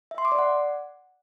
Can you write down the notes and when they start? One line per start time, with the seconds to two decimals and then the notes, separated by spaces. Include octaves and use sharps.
0.11 E5
0.18 C6
0.25 D6
0.32 D5
0.39 F#5